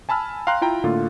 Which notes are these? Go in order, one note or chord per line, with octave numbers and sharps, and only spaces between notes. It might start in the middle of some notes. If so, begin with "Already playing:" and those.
G#5 A5 B5 E6 F6
F5 G5 A#5 C6 F#6
E4 F4 G5 A#5
A2 D3 A#3 F4 A4